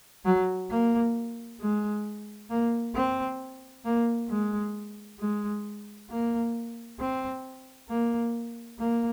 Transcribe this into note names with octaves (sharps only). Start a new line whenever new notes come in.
F#3
A#3
G#3
A#3
C4
A#3
G#3
G#3
A#3
C4
A#3
A#3